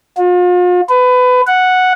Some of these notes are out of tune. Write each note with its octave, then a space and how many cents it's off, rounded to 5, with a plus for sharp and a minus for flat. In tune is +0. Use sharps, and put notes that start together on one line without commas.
F4 +40
B4 +25
F#5 -5